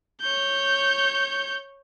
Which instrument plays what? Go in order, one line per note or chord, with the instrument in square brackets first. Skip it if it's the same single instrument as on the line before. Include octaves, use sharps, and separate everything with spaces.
[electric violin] C#5 G6